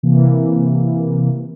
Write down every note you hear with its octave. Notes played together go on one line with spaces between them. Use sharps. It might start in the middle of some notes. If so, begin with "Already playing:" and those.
C3 E3 A#3